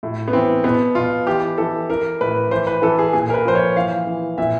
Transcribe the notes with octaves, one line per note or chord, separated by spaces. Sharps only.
A2
B3
E3 C4
B2 B3
B2 F4
E3 G4
E3 A4
E3 A#4
A2 B4
E3 C5
B4
E3 A4
G#4
A#2 G#4
A#4
B4
F3 C5
C#5
E3 F5
E3
A#2 E5